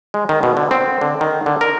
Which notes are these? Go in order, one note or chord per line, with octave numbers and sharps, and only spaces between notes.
G#3
D#3
B2
D3
C4
D3
D#3
D3
A#4